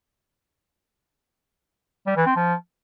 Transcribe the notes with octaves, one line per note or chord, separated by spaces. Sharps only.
G3
E3
C4
F3